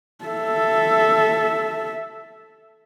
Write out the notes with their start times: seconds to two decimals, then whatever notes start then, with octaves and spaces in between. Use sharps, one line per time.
0.25 A4 E5